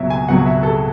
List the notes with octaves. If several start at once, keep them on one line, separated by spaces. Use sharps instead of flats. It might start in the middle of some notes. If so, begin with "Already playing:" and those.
Already playing: C#2 B2 F#3 E5
G#5
C#2 B2 F#3 F#5
E5
A4